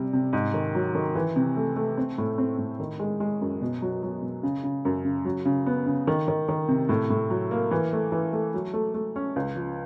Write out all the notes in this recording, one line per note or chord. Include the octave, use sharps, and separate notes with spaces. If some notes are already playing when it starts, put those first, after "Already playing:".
Already playing: C3 G3
C3
G#2
D#3
F#3
D#3
E3
C3
A3
A3
C4
A2
C4
A2
D#3
G#3
G#3
F#2
B2
F#3
F#3
B2
C#3
C#3
F#2
C#3
F#3
C#3
B3
C#3
D#3
D#3
D#3
C3
A2
A2
F#3
A#3
E3
A3
E3
A3
F#3
A3
A3
C#4
C#2
F3